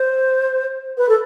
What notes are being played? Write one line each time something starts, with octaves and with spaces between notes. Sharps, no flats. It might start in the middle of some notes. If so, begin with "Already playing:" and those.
Already playing: C5
B4
A4